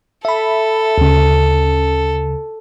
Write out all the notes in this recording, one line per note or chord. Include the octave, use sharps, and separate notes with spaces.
A4 E5 B5
D2 C#3